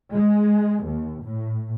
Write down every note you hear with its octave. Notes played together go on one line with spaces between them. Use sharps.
G#3
D#2
A2